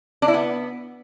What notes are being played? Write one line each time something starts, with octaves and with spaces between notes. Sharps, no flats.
D4
E4
B3